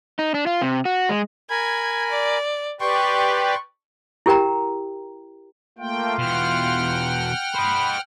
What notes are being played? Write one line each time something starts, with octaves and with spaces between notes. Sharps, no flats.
D#4
D4
F4
C3
F#4
G#3
A#4 G#5 B5 G#6
D5
G4 B4 D5 G5 C6 C#6
E4 G4 A#4 G5 A#5
A3 A#3 F4 G5
E2 B2 F#5 G5 F6
C5 D#5 B5